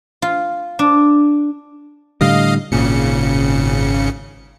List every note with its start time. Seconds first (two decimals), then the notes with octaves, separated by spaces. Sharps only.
0.22 F4
0.79 D4
2.21 A2 D3 G3 D#5 F5
2.72 G#1 A#2 C#3 C#7